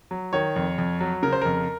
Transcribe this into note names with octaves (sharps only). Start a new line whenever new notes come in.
F#3
D#3 C#5
F2
F2
F#3
C#3 A#4
C5
F2 A#4